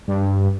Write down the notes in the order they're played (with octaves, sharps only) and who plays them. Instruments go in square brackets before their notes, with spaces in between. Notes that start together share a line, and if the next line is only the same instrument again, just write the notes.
[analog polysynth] G2